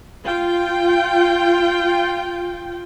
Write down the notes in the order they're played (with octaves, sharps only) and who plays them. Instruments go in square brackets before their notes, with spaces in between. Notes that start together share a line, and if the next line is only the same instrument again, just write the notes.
[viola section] F4 G5